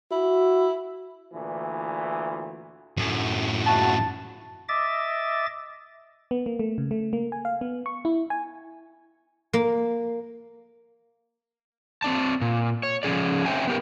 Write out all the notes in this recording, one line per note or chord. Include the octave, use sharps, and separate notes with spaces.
E4 F#4
D2 A#2 E3
F#2 A2
C#2 E4 F#4 A5
D#5 E5 D6 A6
B3
A#3
A3
C#3
A3
A#3
G#5
F5
B3
C#6
E4
G#5
A#3
C4 D5 A5
A#2
C#5
F3 C#4 G#4 D5
C4 C5 C#5 E5 G5 G#5
B3 G4 A#4